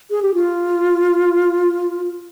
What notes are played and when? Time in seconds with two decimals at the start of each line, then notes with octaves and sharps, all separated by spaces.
0.11 G#4
0.22 G4
0.34 F4